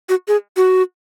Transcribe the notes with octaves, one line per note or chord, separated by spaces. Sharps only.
F#4
G#4
F#4